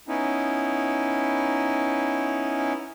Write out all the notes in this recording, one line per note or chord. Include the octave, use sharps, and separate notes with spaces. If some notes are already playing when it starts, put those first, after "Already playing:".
B3 C#4 D#4 E4